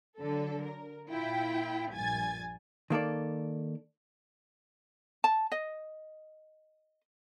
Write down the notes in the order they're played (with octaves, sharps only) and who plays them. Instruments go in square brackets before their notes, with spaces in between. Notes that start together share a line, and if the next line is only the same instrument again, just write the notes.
[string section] D3 F#3 A4
A#4
A#2 E4 F4 G5
A#1 G2 G#5 G#6 A6
[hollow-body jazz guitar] D#3 A#3 A4 D5
[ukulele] A5
D#5